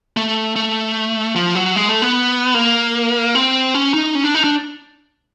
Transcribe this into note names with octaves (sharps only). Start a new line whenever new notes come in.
A3
A3
F3
F#3
G#3
A3
B3
A#3
C4
C#4
D#4
C#4
D4
D#4
D4